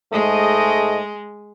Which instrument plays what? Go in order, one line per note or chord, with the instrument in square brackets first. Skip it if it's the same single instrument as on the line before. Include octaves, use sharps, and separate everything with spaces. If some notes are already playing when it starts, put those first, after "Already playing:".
[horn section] G#2 A3 D#5 [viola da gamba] G#3